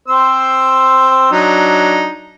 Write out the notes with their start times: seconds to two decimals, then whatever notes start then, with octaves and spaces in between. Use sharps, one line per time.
0.08 C4 C5 E6
1.32 F#3 D4 D#4